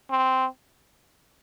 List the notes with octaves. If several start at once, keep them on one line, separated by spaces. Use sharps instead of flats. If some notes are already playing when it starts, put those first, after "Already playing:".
C4